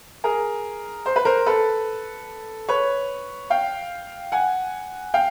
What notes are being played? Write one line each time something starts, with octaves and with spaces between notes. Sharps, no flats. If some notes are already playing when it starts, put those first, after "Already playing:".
G#4 A#4
C5
B4
A#4 C5
A4 B4
B4 C#5
F5 G5
F#5 G#5
F5 G5